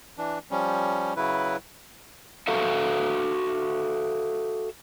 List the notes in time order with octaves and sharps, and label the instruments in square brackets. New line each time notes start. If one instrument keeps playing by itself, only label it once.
[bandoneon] E3 D4
F3 G3 C#4
C#3 F#3 E4 B4
[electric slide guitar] F#4 A4 E5 F5